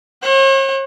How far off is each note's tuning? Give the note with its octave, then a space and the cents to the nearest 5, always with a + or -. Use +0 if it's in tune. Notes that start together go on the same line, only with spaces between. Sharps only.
C#5 -45 F#5 +25